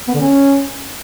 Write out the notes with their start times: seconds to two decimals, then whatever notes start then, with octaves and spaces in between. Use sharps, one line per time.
0.08 B3
0.14 D3
0.20 C#4